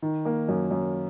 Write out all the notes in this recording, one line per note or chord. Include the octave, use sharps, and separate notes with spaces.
D#3
A#3
F#2
F#2